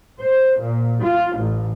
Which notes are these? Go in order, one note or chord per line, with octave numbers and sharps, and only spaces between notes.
C5
A#2
F4
A1